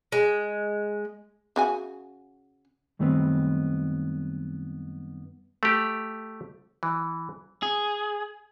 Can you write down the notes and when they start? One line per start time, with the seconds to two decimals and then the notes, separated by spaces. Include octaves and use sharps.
0.12 G#3
1.56 C#3 F#4 G#5
2.99 F#2 D#3 G3 A3 B3 C4
5.63 A3 G4
6.83 E3
7.63 G#4